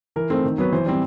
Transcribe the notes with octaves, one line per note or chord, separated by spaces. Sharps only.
E3 A#4
A3 C4
D#3
F#3 B3 B4
E3 C5
G3 C4